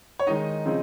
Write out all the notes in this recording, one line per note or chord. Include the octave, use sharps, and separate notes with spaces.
C#5
D#3 G#3 D#4 D#5
C#3 F3 C4 D#4